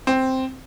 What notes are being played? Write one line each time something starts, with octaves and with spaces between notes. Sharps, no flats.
C4